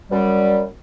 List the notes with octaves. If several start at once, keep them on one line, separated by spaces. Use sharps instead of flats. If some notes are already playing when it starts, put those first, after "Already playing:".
F#2 G3